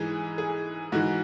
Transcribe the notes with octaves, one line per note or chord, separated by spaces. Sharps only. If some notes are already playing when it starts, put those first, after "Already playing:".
Already playing: G#2 E3 G#4
G#4
G#2 E3 F#4